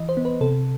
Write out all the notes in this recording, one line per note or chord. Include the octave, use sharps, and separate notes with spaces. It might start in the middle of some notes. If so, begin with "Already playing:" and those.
Already playing: E3 D#5
C5
B3
B4
C3 A4